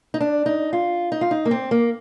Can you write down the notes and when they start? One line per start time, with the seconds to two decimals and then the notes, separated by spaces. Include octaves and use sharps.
0.14 D#4
0.20 D4
0.46 D#4
0.73 F4
1.12 D#4
1.21 F4
1.31 D#4
1.45 A#3
1.51 C4
1.71 A#3